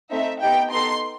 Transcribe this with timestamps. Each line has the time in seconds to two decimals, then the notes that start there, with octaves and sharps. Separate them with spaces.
0.11 A3 C4 D#4 A4 E5
0.41 B3 D#4 G4 G5
0.71 B3 D#4 A4 C6